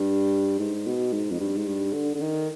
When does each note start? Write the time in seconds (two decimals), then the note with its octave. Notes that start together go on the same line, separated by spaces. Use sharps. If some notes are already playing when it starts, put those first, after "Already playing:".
Already playing: G2
0.59 G#2
0.87 B2
1.13 G#2
1.31 F2
1.40 G2
1.56 G#2
1.67 G2
1.93 D3
2.15 D3
2.20 D#3